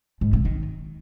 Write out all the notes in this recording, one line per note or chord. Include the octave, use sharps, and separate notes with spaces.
G#2
C3
D#3